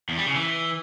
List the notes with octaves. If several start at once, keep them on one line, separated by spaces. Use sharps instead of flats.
E2
G3
C#3
E3